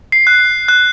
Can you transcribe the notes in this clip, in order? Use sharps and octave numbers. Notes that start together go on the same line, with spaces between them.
C7
F#6
F#6